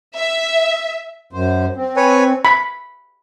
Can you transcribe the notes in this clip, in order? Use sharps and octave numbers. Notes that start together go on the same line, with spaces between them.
E5
F#2 C5
C4
B4 C#5 G#5
B5